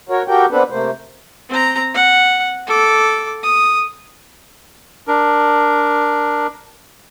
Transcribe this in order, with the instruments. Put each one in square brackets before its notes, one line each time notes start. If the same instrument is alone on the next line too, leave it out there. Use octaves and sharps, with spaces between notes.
[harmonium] F#4 A#4 C#5
F#4 G4 A4 A#4 G5
B3 C4 D4 A4 B4
C3 A3 A#3 C5
[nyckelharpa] C4 A#5
F#5
A4 D6
D#6
[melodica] D4 A#4